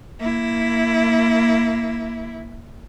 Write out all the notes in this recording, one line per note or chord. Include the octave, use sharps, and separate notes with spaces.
A#3 E4